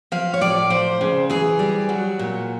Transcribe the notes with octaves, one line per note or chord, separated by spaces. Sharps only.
F3 F5
C#5
A2 D5
F3 C5
C#3
E3 G#4
G3
F#3 F#4
A#2